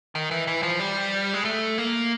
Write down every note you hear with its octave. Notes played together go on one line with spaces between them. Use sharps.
D#3
E3
E3
F3
G3
G#3
A3
A#3